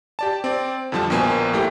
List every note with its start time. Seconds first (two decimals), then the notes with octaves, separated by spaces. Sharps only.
0.19 G4 D5 A5
0.44 C4 D5
0.92 F2 D3 F3 G3 A5
1.10 A#1 B2 A#3 C5 G#5
1.53 G1 A3 E4 G4 G5